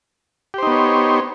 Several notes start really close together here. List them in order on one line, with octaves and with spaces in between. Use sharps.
G4 C5 D#4 B3 C#5